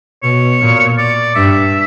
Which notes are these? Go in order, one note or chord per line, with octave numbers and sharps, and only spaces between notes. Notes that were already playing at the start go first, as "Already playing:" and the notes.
B2 C#5
A#2
D5
G2 E5